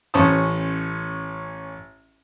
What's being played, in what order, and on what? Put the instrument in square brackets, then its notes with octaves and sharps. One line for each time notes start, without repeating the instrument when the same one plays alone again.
[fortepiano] A1 C#4 C5 A5 D#6